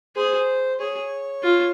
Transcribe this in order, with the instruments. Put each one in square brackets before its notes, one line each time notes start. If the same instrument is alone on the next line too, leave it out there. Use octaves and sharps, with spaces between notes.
[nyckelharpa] G#4 [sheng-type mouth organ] C5
[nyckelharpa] G#4 [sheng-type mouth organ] C#5
[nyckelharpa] F4